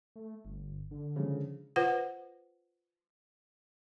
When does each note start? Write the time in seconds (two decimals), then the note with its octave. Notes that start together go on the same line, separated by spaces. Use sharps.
0.16 A3
0.45 G1
0.91 D3
1.16 C#3 F3 G#3
1.76 F4 B4 C5 F#5